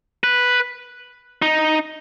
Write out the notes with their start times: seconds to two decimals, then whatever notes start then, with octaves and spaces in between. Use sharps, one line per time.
0.24 B4
1.42 D#4